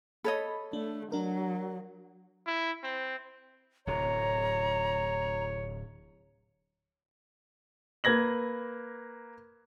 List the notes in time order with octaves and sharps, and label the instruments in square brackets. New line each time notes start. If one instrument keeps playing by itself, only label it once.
[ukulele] A4 C#5 D#5 [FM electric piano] B5
[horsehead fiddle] A3 [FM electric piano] D4
[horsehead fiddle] F#3 [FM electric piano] D4 A#4
[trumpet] E4
C4
[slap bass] D1 C3 [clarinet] C#5 [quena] A#5
[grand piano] A#3 B4 G#6 A#6 F#7